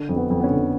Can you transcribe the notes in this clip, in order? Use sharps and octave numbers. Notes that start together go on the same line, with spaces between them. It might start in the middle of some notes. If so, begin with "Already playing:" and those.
Already playing: D3
F2
B3
F2
B3
C#4
D3